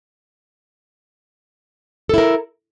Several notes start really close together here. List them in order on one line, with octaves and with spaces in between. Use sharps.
A4 E4 A#4